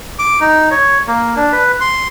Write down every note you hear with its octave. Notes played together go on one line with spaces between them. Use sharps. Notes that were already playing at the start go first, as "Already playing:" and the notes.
D6
D#4
C#5
A#3
D4
B4
C6